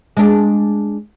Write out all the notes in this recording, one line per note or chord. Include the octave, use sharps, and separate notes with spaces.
G#3 D4